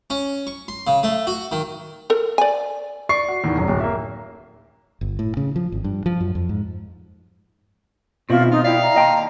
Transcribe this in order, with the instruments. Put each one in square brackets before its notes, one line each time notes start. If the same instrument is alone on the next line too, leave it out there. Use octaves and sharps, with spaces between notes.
[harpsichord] C#4
C#6
C6
C#3
A3
F#4
D#3
[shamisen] A4 A#4
D5 G#5
[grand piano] D5 C#6 C7
F#4
E2 D#3
F1 F#2
D1
A#3 E5
[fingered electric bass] G1
A2
C#3
F3
G#1
G2
F3
F#2
F2
G#2
[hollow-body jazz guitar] B2 [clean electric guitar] D#3 C4 [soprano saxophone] E4 [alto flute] F4
[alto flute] D#4 [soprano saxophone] F4
[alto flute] E4 [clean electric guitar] D5 E5 G5 [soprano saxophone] F5
[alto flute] A#5
[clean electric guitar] D#2 A5 C6 [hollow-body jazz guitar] D#5 G5